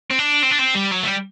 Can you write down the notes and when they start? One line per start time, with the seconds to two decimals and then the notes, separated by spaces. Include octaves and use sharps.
0.11 C4
0.19 D4
0.43 C4
0.51 D4
0.59 C4
0.75 G3
0.92 F#3
1.03 A3
1.08 G3